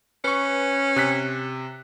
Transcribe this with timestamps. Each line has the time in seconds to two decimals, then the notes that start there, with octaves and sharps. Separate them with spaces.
0.24 C#4 B4 C#6
0.96 C3 F#6 B6